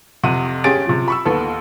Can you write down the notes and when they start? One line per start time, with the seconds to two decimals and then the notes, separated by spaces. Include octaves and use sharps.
0.23 F2 C3 F#5 D#7
0.64 G1 C#4 G4 G#4 A6 D7
0.86 C3 F3
1.08 B5 C#6 E6
1.25 D#2 B3 A4